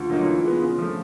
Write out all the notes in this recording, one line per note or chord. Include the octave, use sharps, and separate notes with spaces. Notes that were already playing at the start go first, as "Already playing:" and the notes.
Already playing: D2 F4
D3 F#3 A#3 D#4
E3
G#3 B3
C#3
F3 A3